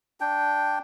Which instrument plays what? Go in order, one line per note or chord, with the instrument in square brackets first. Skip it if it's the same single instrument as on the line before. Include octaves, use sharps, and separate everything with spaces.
[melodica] D4 G5